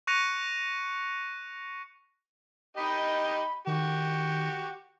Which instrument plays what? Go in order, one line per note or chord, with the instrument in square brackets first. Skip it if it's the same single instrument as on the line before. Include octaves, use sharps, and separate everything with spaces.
[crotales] C#6 F#6 A#6 C#7 D#7 F7
[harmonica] D#4 G4 D#5 [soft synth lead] B5
[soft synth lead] D#3 [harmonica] F#4 G4